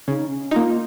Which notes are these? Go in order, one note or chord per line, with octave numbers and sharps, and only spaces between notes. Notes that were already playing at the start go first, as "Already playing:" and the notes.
C#3 D#4
C#4
A#3 D#4 F4